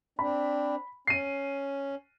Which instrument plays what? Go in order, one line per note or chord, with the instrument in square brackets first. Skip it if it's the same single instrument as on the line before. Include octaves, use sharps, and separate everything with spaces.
[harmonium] C4 D4 [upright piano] B5
[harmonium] C#4 [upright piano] C7 D#7